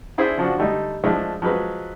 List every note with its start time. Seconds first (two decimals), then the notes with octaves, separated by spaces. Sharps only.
0.18 D4 E4 G#4 C5 D5 E5
0.37 C#3 F3 D4 F#4
0.57 D3 G3 A3 D#4
1.04 F3 G#3 A3 D4 D5
1.42 F3 F#3 G#3 B4